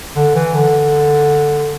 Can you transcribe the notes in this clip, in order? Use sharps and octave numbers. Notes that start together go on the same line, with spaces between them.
D3
E3
D3